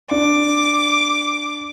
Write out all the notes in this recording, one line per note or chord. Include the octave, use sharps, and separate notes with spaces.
D4 D6